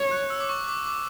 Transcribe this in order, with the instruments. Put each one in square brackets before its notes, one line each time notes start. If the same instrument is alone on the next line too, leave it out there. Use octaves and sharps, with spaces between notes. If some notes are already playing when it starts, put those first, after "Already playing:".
Already playing: [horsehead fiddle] C#5
[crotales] F#6
E6
D6
C#6
D6
D6